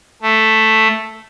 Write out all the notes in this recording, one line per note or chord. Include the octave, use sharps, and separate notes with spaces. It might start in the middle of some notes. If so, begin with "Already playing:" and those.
A3